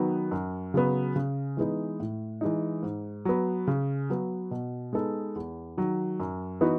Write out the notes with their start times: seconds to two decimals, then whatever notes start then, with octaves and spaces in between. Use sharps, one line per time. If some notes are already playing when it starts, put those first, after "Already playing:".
Already playing: D#3 F#3 B3
0.31 F#2
0.74 C#3 F#3 B3
1.16 C#3
1.57 E3 G#3 B3 D#4
2.00 A2
2.41 E3 G#3 D#4
2.83 G#2
3.25 F#3 B3
3.67 C#3
4.10 F#3 B3
4.51 B2
4.93 G#3 B3 D#4 A4
5.36 E2
5.77 D#3 F#3
6.20 F#2
6.61 E3 B3 D#4 F#4